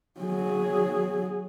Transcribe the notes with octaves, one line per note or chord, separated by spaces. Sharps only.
F#3 G#4